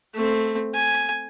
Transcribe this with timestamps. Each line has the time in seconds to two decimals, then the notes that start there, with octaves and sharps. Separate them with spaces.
0.15 A3 C4
0.75 G#5